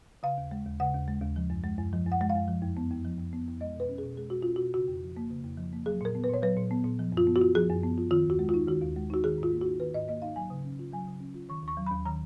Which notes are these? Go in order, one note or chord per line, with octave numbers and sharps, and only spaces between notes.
C#3 F5
D#2
G#3
D#2
C#3 F#5
D#2
G#3
D#2
F3
F#2
G#3
F#2
F3
F#2
F#5
G#3
F5
F#2
F3
F2
B3
F2
F3
F2
B3
F2
G#3 D#5
B2 B4
C#4
B2 G#4
G#3 G#4
B2 F#4
C#4 F4
B2 F#4
C#3 F#4
F2
F3
A#3
C#3
F2
F3
A#3
F#3 G#4
A#2 A#4
B3
B4
A#2 C#5
F#3 B4
A#2
B3
A#2
F3
F#2 F4
B3
F#4
F4
F3 G#4
F#2
B3
F4
D#3 F4
D#2 F#4
G#3
F4
D#4
D#3 F#4
D#2
G#3
D#4 F#4
D#3 G#4
G#2
F4
A#3
D#4 F#4
D#3 B4
G#2 D#5
A#3 D#5
D#4 F5
F#3 G#5
C#3
C#4
F4
F#3 G#5
C#3
C#4
F4
D#3 C#6
D#2 C#6
F#3
D#2 B5
D#3 A#5